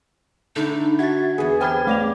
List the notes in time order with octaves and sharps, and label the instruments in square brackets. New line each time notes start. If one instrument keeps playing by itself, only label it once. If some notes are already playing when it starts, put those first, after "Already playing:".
[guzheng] D3 E4 [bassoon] A3 [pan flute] D#4
[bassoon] F#4 [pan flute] E5 [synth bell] G#6 A6
[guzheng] E2 B3 [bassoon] G#4
[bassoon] C4 [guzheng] G4 A4 [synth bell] G5 B5 G#6 [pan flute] F6
[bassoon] C#3 [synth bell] A3 D5 F7 [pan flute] D6